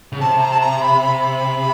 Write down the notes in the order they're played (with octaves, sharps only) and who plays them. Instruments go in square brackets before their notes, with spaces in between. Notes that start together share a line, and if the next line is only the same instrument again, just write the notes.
[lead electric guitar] C#3
[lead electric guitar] C3 [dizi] A5
[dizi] A#5
A5
A#5
B5
B5